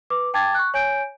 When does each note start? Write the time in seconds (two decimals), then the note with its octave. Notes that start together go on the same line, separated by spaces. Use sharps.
0.10 B4 D6
0.34 G5 A5 D6 G#6 A6
0.55 C#6 F#6
0.74 C#5 G#5 G6 D7